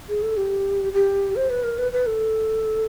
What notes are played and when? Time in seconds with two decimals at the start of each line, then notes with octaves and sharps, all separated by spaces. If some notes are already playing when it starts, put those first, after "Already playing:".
0.09 G#4
0.23 A4
0.37 G4
0.93 G4
1.36 C5
1.50 B4
1.64 A#4
1.79 B4
1.92 B4
2.07 A4